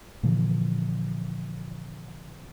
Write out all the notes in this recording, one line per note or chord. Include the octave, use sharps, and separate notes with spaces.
A#2 D3 E3 F3